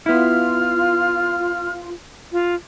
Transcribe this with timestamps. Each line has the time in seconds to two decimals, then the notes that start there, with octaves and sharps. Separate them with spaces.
0.06 B3 E4 F4 F6
2.32 F4